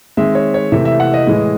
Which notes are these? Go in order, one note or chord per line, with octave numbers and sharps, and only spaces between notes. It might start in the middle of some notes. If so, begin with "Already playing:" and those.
D#3 G#3 C4 E5
C#5
C#5
C3 E3 A3 C4 E5
E5
F#5
D#5
A2 E3 G#3